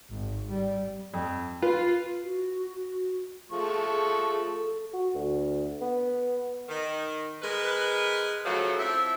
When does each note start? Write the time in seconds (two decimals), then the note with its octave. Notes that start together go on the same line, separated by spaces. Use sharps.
0.10 G#1
0.49 G3
1.14 F2
1.62 F4 B4
2.24 F#4
3.52 F3 A3 G#4 C#6
3.89 G#4
4.51 A4
4.93 F#4
5.14 D2
5.81 B3
6.69 D#3
7.42 G#3 A#4 B4
8.46 C#3 F3 F#3 A3
8.79 F3 C4 E4 E5